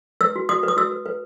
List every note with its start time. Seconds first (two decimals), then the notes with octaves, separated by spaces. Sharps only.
0.21 B4 E6
0.36 F#4
0.49 F#4 D#6
0.63 B4
0.68 D#6
0.77 F#4 E6
0.92 B4
1.06 B4